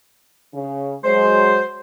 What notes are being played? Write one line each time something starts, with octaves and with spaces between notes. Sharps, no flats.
C#3
F#3 G#3 C5